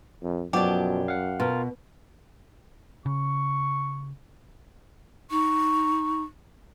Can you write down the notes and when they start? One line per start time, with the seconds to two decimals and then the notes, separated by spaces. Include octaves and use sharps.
0.22 F2
0.53 F#2 B2 F3 F#3 G4 D5
1.08 F5 F#5
1.40 B2 F4 A#4
3.06 C#3 C#6
5.31 D#4 C#6